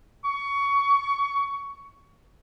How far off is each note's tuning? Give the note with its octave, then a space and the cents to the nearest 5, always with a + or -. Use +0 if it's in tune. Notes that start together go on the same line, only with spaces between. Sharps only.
C#6 +20